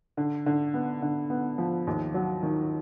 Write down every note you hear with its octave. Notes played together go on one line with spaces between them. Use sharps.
D3
D3
B3
D3
B3
F3
D#2
F#3
D#3